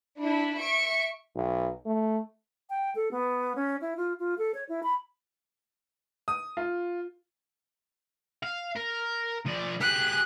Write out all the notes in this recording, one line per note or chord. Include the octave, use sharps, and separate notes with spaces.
D4 E4
E5 C#6 D7
B1
A3
G5
A4
B3
C#4
E4
F4
F4
A4
C#5
E4
B5
D#6
F4
F5
A#4
F3 D5
G4 G#4 F#6